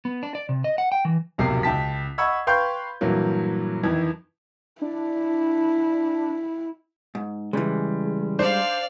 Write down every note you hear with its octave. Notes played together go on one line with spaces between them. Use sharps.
B3
D4
D5
C3
D#5
F#5
G5
E3
D1 B1 F2 C3 A#3 C7
C#2 G5 A5 B6
D#5 F#5 B5 C#6 E6 G#6
B4 F5 G5 C6 C#6 G6
G2 A#2 E3 F#3 A#3
F2 D#3 E3 G#6
D4 E4
G#2
C#3 E3 G3 G#3
D4 C5 D5 F5